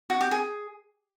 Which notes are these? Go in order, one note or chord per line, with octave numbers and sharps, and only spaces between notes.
F#4
G4
G#4